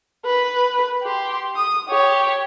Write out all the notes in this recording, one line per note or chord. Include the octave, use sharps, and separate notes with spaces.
B4
G4 C6
D#6
G4 C#5